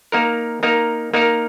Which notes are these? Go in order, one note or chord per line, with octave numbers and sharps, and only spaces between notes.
A#3 D#4 A#4
A#3 D#4 A#4
A#3 D#4 A#4